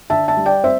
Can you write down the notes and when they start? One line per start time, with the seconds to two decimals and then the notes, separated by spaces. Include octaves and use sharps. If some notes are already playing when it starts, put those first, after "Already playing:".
0.10 D3 E5 A5
0.28 E5 A5
0.37 G3
0.46 D5 G5
0.64 C4 C5 E5